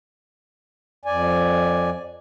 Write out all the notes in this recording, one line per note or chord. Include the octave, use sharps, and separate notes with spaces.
F2 D5 G#5